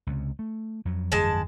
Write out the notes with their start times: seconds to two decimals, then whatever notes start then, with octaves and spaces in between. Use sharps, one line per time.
0.07 C#2 C3
0.39 A3
0.85 F2 F#3
1.12 G1 F2 E3 G#3 A5